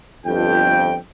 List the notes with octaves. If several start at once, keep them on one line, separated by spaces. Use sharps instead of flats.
G1 F2 G5